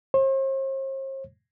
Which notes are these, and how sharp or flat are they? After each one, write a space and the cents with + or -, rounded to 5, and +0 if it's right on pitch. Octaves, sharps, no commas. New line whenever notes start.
C5 +45